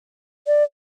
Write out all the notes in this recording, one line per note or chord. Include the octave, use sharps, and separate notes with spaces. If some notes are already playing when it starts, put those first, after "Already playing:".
D5